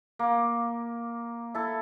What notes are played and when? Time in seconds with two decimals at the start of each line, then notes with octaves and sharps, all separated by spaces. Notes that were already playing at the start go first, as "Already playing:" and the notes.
0.19 A#3
1.54 E4 A4 A5